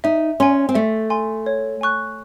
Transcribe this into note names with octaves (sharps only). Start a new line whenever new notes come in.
D#4 E5
C#4 G#5 C6
C4
A3 E5
G#5 C6
C#5
G#5 C#6 F#6